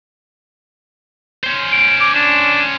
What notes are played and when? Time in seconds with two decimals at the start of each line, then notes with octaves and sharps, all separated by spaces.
1.43 C#4 C5
1.72 D7
2.00 D6
2.15 D4 E7